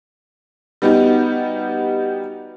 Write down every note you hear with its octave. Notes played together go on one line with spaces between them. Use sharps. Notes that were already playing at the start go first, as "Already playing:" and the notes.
G3 B3 D#4 F#4 G4